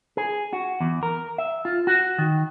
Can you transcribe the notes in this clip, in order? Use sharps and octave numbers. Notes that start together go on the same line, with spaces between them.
G#4
F#4
E2
A#4
E5
F4
F#4
D#3